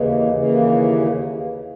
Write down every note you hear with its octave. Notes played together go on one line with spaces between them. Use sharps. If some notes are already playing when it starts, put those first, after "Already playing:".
Already playing: D#2 C#3 E3 A#3 B4 D#5
D#2 C#3 E3 A#3